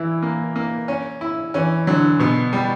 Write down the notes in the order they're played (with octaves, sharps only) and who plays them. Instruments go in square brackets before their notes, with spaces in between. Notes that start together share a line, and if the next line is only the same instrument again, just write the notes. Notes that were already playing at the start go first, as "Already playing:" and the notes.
Already playing: [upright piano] E3 [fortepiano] E4
[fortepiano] A#3
A#3
C#4
E4
[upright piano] E3 [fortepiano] C#4
[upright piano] D3 [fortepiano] F#3
[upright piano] B2 [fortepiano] B3
[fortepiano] G3